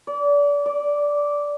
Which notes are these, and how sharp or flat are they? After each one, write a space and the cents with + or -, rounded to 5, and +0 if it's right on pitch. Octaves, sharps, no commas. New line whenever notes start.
D5 -30
D5 -10